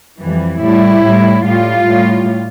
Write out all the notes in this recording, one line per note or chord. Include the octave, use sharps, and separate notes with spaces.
F2 E3 G3
A2 G3 E4
A2 G3
A2 G3 F4
A2 G3